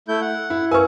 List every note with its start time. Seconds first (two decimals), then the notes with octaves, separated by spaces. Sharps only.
0.08 A3 E4 G6
0.21 F#5
0.50 E4
0.71 A#4 B4 G#5 C#6